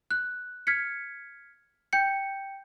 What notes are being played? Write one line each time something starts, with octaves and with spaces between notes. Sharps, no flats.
F#6
F6 G#6 B6 C#7
G5 G6 C#7